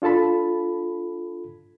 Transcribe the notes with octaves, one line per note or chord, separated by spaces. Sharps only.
D4 F4 A4 A5 B5